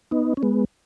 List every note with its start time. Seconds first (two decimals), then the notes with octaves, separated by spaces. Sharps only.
0.11 B3 D#4
0.37 C#4
0.43 G#3 B3